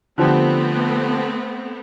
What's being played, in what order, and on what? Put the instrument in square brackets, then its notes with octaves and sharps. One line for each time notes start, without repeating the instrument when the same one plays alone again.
[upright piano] D3 F3 G4 [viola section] A3 B3 C4